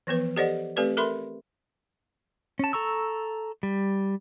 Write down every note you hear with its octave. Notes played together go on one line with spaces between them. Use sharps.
E3 F3 B3 B4
G4 A4 C5 D5 D#5 F#5
A3 C4 G4 A4 B4 D5
A4 A#4 E5 B5 C6
C#4 A5
A4 A#5 C#6 E6
G3